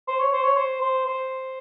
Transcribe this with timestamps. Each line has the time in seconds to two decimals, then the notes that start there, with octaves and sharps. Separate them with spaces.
0.08 C5
0.20 C#5
0.33 C5
0.44 C#5
0.57 C5
0.81 C5
1.06 C5